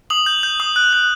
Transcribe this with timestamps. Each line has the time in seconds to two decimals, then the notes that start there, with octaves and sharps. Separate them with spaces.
0.10 D#6 F#7
0.26 G6
0.43 G6
0.60 D#6
0.76 F#6
0.93 F#6